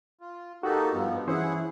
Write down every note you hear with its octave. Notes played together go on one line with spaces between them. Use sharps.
F4
A#3 D#4 F#4 G4 A4
G2 F3 B3
E3 C#4 E4 G#4 C5 F#5